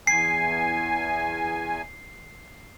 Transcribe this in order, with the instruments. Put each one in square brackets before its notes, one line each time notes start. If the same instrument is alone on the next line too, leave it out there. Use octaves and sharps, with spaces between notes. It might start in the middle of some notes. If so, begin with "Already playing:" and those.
[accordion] E2 G#5 [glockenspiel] C7